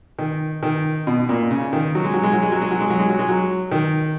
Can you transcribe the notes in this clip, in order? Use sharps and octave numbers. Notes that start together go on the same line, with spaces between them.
D#3
D#3
B2
A#2
C#3
D#3
F#3
G#3
F#3
G#3
F#3
G#3
F#3
G#3
F#3
G#3
F#3
G#3
F#3
G#3
F#3
D#3